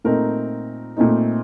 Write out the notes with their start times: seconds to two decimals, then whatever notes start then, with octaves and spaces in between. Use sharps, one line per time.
0.04 A#2 A3 C4 D#4 A#4
0.96 A#2 A3 C4 D#4